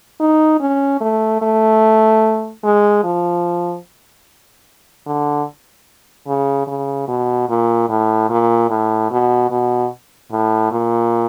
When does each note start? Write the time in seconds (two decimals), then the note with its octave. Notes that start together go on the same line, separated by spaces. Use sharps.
0.20 D#4
0.60 C#4
1.01 A3
1.42 A3
2.63 G#3
3.03 F3
5.06 D3
6.27 C#3
6.67 C#3
7.08 B2
7.49 A#2
7.89 A2
8.30 A#2
8.70 A2
9.11 B2
9.51 B2
10.32 A2
10.72 A#2